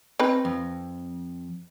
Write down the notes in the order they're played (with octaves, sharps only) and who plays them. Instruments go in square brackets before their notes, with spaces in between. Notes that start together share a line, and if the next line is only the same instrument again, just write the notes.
[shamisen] C4 D#4 B4
[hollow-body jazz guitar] F2